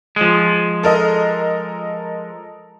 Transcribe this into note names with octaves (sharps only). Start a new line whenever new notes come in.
F3 G#3
A4 A#4 D#5